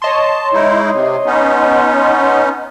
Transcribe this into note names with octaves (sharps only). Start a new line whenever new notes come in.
C#5 D#5 A5 C6
G#3 D#4 E4
C3
B3 C#4 D#4